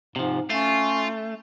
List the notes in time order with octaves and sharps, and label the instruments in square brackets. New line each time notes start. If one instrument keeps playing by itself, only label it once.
[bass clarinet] G#2 [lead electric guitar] C3 F3
[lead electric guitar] A3 [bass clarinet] C#4 [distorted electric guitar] F4